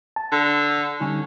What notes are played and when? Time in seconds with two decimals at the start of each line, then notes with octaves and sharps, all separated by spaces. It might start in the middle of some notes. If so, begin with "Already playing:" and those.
0.16 A5
0.32 D3
1.01 D3 G3 C#4 D#4